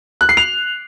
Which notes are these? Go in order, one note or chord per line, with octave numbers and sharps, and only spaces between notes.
F#6
C7
F7